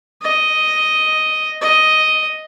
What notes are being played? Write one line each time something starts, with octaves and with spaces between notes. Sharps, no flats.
D#5
D#5